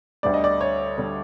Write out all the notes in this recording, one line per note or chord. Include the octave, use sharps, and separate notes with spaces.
D2 D3 G3 D5
D#5
D5
C#5
D3 G3